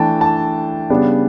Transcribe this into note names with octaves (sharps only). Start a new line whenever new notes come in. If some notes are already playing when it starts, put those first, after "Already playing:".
Already playing: E3 A3 D4 G5 A5
A5
C#3 G3 B3 D4